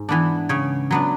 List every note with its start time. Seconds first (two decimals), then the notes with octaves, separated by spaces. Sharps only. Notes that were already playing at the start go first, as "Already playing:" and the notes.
Already playing: G#2
0.09 E3 B3 D4
0.49 C#3 C#5
0.91 F#3 B3 D4